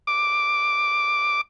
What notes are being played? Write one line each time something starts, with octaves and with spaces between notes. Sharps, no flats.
D6